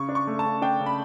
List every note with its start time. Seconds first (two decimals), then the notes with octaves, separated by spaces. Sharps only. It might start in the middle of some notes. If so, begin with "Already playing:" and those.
Already playing: C#3 C#6
0.09 D4
0.15 C#6
0.27 A3
0.39 A5
0.45 C#3
0.62 D4 G5
0.80 C#3
0.86 B5